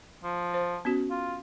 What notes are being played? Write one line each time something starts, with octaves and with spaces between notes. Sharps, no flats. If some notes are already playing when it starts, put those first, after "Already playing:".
F3
C5
B3 C#4 F#4
F4